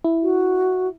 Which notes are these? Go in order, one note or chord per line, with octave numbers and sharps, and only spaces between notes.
E4
F#4